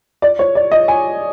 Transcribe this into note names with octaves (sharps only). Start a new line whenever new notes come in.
D5
C#5
D5
D#5
G#5